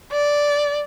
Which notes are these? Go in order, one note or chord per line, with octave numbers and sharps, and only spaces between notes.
D5